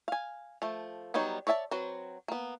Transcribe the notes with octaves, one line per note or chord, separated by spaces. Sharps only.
F5 G#5
F3 A3
F#3 G3 B3 D#4 C#5
C#5 D5 E5 G#5 A5
F#3 C4 F#4 B4
A#3 B3